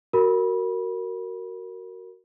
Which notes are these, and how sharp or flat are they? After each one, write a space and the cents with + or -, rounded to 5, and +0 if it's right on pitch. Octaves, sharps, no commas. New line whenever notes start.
F#4 +10 A#4 -15 B5 -20